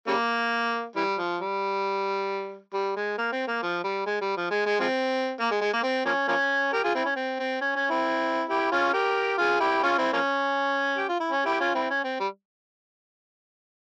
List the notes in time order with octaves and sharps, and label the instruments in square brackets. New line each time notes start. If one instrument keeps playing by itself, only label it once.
[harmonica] C#3 G3 A#3
E3 G3
F3
G3
G3
G#3
A#3
C4
A#3
F3
G3
G#3
G3
F3
G#3
G#3
F3 G#3 C4
A#3
G#3
G#3
A#3
C4
F3 A#3 C#4
F3 A#3 C#4
G4 A#4
F4 G#4
C4 E4
C#4
C4
C4
C#4
C#4
C4 E4
E4 G4
C#4 F4
G4 A#4
F4 G#4
E4 G4
C#4 F4
C4 E4
F3 A#3 C#4
G4
F4
E4
C#4
E4 G4
C#4 F4
C4 E4
C#4
C4
G3